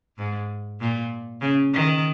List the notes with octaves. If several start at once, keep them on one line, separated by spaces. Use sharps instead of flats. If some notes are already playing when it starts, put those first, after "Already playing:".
G#2
A#2
C#3
D#3